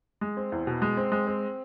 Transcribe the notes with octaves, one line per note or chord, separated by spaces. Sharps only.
G#3
C4
E2
B2
G#3
C4
G#3
C4